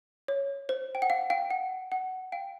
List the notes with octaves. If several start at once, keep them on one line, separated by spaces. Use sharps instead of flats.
C#5
C5
G5
F#5
F5
F5 G5
F#5
F#5
F5 G5